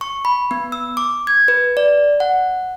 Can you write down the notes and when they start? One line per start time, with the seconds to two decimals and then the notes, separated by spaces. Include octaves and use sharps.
0.01 C#6
0.25 B5
0.51 B3
0.72 E6
0.97 D6
1.27 G#6
1.48 B4
1.77 D5
2.20 F#5